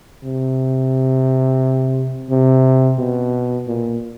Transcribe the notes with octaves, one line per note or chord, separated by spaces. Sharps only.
C3
C3
B2
A#2